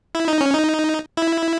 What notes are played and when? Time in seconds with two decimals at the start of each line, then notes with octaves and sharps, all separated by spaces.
0.15 E4
0.28 D#4
0.41 C#4
0.54 D#4
1.17 E4